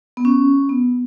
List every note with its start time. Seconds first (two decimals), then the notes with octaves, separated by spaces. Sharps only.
0.17 B3
0.25 C#4
0.69 B3